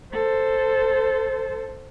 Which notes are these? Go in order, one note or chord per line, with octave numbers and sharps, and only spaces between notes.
A4 C5